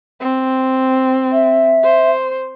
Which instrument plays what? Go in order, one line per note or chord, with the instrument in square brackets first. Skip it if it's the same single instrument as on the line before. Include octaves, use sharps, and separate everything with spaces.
[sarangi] C4
[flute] E5
[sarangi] C5